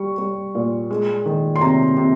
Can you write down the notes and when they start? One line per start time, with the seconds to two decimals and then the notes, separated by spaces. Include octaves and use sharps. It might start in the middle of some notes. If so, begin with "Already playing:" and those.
Already playing: G3 C#6
0.18 G3
0.55 A#2
0.91 G#3
1.26 D#3
1.56 C6
1.61 C3 A#5
1.97 C3